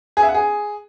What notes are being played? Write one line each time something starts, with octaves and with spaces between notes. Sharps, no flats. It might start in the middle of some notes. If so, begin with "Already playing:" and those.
G#4
E5
F#5
G#4